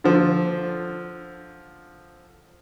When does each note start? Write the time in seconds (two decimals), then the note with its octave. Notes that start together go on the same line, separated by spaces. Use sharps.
0.04 D3 F3